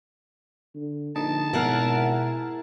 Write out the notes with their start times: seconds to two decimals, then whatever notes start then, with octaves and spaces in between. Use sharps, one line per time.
0.75 D3
1.16 A#1 D3 D#4 D#5 A5
1.53 G#1 B2 E4 G#4 A#4 F#5 F6